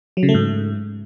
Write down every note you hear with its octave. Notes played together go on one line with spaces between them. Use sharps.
F#3
C#3
A3
G#2